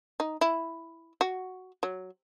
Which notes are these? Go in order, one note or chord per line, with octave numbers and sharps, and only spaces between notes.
D#4
E4
F#4
F#3